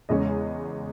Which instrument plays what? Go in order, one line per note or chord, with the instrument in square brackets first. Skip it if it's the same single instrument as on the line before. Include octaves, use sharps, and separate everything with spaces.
[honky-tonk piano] E2 C#3 G#3 C#4 D#5